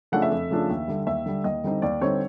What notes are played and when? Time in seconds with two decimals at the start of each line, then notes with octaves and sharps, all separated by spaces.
0.12 C#3 F3 A3 D4 F#5
0.22 E5
0.31 F2
0.51 C#3 F3 A3 D4
0.69 D#2
0.88 D3 G3
1.07 D#2 E5
1.26 D3 G3
1.44 D#2 D#5
1.64 D3 G3 C4 D#4
1.82 D#2 D5
2.01 D3 G3 C4 D#4 C#5